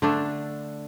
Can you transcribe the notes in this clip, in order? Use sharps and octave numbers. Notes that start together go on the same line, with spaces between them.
D3 A3 D4 A4